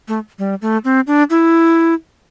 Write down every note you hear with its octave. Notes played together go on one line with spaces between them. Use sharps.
A3
G3
A3
C4
D4
E4